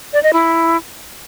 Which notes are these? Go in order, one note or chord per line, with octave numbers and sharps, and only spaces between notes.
D5
D#5
E4